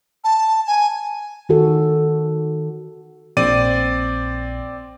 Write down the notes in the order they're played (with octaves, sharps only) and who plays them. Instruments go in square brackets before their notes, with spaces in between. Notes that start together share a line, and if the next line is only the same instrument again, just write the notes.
[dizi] A5
G#5
[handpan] D#3 F#4 A4
[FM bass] A#1 [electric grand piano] C4 D5 D#7